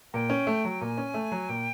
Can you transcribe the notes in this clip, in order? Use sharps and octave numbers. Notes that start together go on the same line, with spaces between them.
A#2 G5
C#4
A3
F#3
A#2 G#5
C#4
A3
F#3
A#2 G5